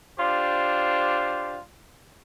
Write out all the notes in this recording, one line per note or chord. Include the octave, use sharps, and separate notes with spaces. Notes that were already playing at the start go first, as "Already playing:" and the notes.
D4 F4 G4 C5